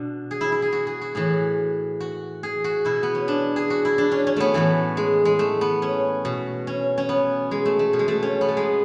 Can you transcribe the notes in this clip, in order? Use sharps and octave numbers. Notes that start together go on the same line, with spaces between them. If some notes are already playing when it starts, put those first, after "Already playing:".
Already playing: B2 D4
G#4
E4
E4
G#4
F#4
G#4
F#4
A2 E3 G#4
F#4
G#4
F#4
B2 E4
B3
C#4
D4
G#4
F#4
E4
D4
C#4
C#4
A3 B3
A2 E3 A3
G#3
G#3
A3
B3
C#4
B2
C#4
C#4
B3
G#3
A3
A3
B2
G#3
A3
C#4
B3
A3
G#3